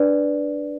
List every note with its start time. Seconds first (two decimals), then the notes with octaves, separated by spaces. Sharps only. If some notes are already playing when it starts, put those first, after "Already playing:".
Already playing: D4 B4 D5